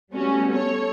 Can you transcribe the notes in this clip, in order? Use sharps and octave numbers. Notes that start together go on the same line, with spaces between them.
G3 A3 B3 C#4 F#4
A4 C#5